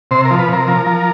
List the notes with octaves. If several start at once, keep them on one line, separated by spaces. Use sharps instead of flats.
C3 C5
A#4
F3
B4
C3 A#4
F3
F3